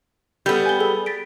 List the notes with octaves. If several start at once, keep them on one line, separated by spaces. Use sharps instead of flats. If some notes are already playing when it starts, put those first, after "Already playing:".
G3 B3 A4 G6
G#5 G7
G#4 A4 G7
A6 B6 D7